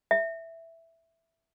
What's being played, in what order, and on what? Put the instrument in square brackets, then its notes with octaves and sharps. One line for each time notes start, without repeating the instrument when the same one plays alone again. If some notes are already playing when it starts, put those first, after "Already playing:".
[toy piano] E5